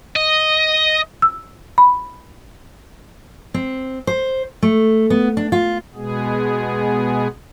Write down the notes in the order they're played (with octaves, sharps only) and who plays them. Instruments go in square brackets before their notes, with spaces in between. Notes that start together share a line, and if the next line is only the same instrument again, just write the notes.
[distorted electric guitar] D#5
[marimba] E6
B5
[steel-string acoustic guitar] C4
C5
A3
B3
D4
F4
[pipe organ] B2 G#3 B3 G#4